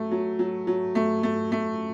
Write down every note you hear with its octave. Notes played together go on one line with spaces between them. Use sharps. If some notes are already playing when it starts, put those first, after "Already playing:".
Already playing: F#3 A3
F#3
F#3
F#3
A3
A3
A3